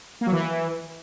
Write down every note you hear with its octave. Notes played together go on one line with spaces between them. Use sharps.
A#3
F#3
E3